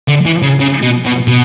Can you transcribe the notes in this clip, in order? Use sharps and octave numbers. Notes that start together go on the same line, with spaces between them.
D3
E3
C#3
C#3
B2
B2
B2